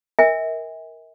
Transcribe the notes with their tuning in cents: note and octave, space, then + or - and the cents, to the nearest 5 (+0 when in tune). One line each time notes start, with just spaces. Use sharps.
A#4 +0 E5 -45 G#5 -40